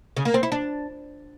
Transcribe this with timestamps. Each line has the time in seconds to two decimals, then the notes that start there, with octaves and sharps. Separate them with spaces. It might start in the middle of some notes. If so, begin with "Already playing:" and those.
0.17 C#3
0.25 A#3
0.34 C4
0.43 E4
0.52 D4